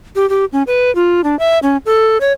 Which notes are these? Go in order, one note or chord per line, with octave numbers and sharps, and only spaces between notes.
G4
G4
C#4
B4
F4
D4
E5
C#4
A4
C#5